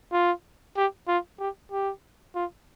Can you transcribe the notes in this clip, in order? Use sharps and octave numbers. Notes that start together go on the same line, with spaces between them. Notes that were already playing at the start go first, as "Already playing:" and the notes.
F4
G4
F4
G4
G4
F4